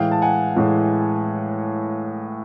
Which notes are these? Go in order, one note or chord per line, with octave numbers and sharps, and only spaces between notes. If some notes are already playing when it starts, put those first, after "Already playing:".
Already playing: A2 E3 G#3 F5 G5
A5
F#5 G#5
A2 E3 G#3